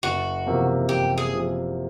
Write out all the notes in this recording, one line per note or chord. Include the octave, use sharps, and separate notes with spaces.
F#1 F#4
E2 C3 F3 A#3
F#1 G4
G#4
C3 F3